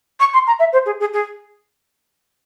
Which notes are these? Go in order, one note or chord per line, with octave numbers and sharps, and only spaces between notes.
C#6
C6
A#5
E5
C5
G#4
G#4
G#4